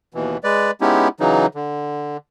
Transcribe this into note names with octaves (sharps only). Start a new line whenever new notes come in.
D#2 B2 E3
G#3 B4 D5
G#3 B3 C#4 D#4 E4 G4
C#3 E3 F#3 D#4
D3